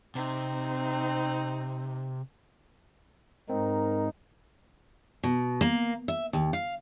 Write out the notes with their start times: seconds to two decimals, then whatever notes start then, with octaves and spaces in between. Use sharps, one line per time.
0.15 C3 C4 D#4
3.50 G#2 C4 D#4 A#4
5.24 B2
5.61 A#3
6.08 E5
6.33 D#2
6.53 F5